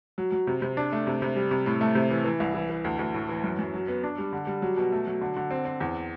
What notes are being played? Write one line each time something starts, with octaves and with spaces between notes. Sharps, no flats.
F#3
F#3
C3
C3
D4
A3
C3
C3
G3
C3
A2
A3
C3
E3
E3
C2
E3
E3
D2
D2
A2
E3
F#2
F#2
F#3
B3
D4
G3
D3
G3
F#3
B2
A3
F#3
D3
D3
C4
C4
E2